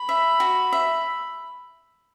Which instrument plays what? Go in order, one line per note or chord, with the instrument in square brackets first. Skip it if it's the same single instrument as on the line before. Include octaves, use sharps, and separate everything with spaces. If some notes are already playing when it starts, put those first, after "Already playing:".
Already playing: [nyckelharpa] B5
[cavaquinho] E5
F#4
E5